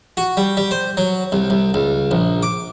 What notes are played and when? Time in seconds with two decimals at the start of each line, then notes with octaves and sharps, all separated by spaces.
0.17 F#4
0.37 G3
0.57 G3
0.71 C5
0.97 F#3
1.32 C2
1.50 C2
1.74 C#2
2.11 A#1
2.43 D6